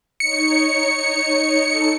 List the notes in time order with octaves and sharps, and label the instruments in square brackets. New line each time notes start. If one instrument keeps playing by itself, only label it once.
[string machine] D#4 C#5 [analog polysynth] C#7
[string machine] D#4 A4